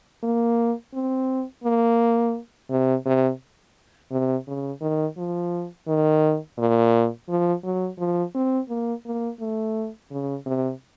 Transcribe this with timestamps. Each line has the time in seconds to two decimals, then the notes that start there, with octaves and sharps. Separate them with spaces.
0.23 A#3
0.94 C4
1.64 A#3
2.70 C3
3.06 C3
4.11 C3
4.47 C#3
4.81 D#3
5.17 F3
5.88 D#3
6.58 A#2
7.29 F3
7.64 F#3
7.98 F3
8.35 C4
8.69 A#3
9.05 A#3
9.40 A3
10.11 C#3
10.46 C3